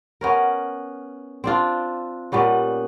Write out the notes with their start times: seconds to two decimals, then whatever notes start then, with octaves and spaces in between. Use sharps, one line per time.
0.21 B3 C#4 A#4
1.44 C4 D4 F4
2.32 A#2 G3 B3 C#4